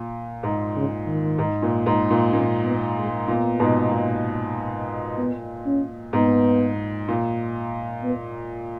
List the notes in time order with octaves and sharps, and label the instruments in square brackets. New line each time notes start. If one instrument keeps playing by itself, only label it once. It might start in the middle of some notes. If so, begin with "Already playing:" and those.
Already playing: [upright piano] A#2
G#2
[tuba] C#3
D#3
[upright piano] G#2
A#2
G#2
A#2
[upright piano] A#2 [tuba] C#4
[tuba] B3
G#3
[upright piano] A#2 [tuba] B3
[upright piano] G#2 B2
A#2
[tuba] B3
C#4
[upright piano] G#2 [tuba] B3
[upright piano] A#2
[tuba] B3